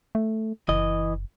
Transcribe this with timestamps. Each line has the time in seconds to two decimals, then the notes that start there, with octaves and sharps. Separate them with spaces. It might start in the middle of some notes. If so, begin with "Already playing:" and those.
0.15 A3
0.69 F#1 E3 D#5